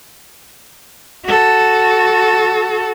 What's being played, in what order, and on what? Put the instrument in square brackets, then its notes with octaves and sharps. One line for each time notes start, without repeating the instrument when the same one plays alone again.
[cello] F#4 A4